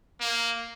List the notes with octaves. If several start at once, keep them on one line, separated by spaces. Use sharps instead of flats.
A#3